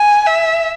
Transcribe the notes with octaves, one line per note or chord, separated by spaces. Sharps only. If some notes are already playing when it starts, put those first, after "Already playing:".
Already playing: G#5
E5